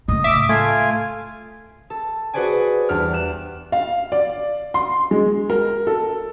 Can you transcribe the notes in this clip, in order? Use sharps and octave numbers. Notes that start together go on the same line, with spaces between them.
A2 C#3 D#5
E5 D6
A3 F4 G#5
A4
F#4 G#4 B4 C5 D5 G#5
E2 G3 D4 F6
F#6 E7
F5
D5
C6
G#3
A#4
A4